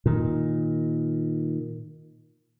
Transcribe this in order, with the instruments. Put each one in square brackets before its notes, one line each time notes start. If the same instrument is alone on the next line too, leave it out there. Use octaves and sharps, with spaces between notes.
[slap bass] A#2 D#3